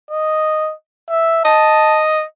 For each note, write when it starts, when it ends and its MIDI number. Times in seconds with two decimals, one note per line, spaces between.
0.11 0.74 75
1.09 1.45 76
1.45 2.22 75
1.45 2.02 81